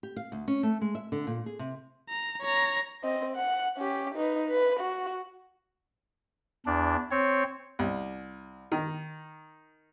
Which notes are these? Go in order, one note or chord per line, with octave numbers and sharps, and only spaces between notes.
G4
F5
D2
C#4
A3
G#3
E5
D3
A#2
G#4
C3
A#5
C#5 A#5
C4 D#5
F#5
C#4 G4
D#4 B4
B4
F#4
E2 D4
C4 C#5
C2
D#3